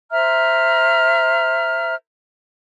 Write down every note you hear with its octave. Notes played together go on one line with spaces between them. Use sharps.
C5 E5 A#5 F6